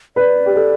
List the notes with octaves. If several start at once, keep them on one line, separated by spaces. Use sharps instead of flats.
B4 D5
G4
A4